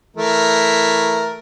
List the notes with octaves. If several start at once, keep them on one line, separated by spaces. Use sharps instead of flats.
E3 A3 A#4